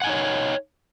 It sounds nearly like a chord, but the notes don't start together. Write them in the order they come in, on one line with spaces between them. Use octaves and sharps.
F#5 G#5 D#4 C#5